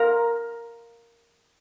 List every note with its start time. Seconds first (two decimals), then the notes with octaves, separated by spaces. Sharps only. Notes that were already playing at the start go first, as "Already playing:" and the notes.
Already playing: A#4 F5 A#5